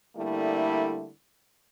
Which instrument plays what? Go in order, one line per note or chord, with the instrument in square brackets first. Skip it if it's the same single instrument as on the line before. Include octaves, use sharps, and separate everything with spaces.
[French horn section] D3 G3 A3 A#3 E4